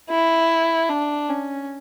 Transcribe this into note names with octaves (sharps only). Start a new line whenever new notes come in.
E4
D4
C#4